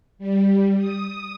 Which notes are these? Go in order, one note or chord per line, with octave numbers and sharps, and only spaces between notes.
G3
D#6